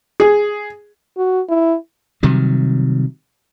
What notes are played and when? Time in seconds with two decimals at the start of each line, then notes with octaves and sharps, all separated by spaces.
0.20 G#4
1.17 F#4
1.49 E4
2.23 C3 D#3 F#3 G3